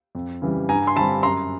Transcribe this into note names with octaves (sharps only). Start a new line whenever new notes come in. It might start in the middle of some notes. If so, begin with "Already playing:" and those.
F2
C#3 E3 G3
G2 G#5 A#5
C6
D3 G3 C4 A5 B5
F#2 A#5 C6